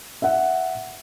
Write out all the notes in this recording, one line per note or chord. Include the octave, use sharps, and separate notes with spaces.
E5 F#5